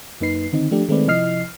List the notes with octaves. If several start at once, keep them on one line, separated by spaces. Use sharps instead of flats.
F#2 A#3 D#4 B4 C7
D3 D#3 C4 D#4
F3 A3 D4 G4
D#3 G#3 A3 C4 B4 D5
C3 F3 E4 D#5 F6 C7